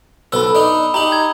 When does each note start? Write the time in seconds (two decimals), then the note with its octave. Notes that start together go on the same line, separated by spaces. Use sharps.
0.32 B1 A4 B4 B5 E6
0.55 D4 D#4
0.94 D#4 G4 A#5 F#7
1.12 G#6